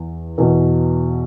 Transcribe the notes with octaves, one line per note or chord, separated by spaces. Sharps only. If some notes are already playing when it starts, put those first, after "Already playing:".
Already playing: E2
E2 B2